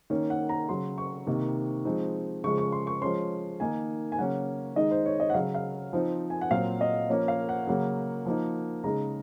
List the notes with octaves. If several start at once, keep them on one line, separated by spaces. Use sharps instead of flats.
D#3 A#3 C#4
F#5
A#5
C#3 F#3 C#4 C6
C#6
C3 D#3 A#3 D#4
F3 G#3 C4 D#4
C#3 F3 G#3 C#6
C#6
C6
C#6
F3 G#3 C#4 C6
D#3 A#3 D#4 G#5
G#5
C#3 F#3 A#3 C#4 F#5
D#3 G#3 D#4 D#5
C5
C#5
D#5
F#5
C#3 F#3 C#4 F5
F5
F3 C4 D#4
G#5
F#5
A#2 F#3 C4 F5
D#5
F3 A#3 C#4 C#5
F5
F#5
C#3 F#3 A#3 C#4
F3 A#3 D#4
C#3 G#3 D#4 A#5